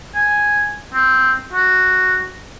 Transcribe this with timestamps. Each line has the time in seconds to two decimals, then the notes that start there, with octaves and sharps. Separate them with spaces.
0.15 G#5
0.94 C4
1.53 F#4